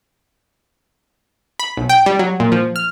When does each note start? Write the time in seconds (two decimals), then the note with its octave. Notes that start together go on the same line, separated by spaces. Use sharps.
1.60 B5
1.77 B1
1.89 G5
2.06 G3
2.19 F#3
2.40 A#2
2.52 F3
2.76 F6